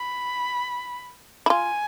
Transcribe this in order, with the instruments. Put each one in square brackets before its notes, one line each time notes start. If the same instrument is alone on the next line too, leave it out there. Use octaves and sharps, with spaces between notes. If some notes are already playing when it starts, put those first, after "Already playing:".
Already playing: [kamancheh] B5
[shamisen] E4
[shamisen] F4 [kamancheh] G#5